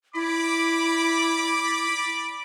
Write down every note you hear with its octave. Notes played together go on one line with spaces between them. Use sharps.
E4 D5 B5 D6